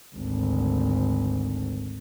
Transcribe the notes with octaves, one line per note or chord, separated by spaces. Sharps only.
G#1 D2